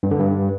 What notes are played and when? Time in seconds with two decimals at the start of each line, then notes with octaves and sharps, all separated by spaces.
0.03 G2
0.11 D3
0.19 G2